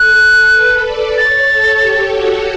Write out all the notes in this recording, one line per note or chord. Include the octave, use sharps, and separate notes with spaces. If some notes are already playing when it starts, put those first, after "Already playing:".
Already playing: A4 F#6
B4
D5
C#5 A6
A4
G4
F#4